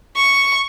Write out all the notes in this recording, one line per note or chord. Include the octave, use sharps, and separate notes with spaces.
C#6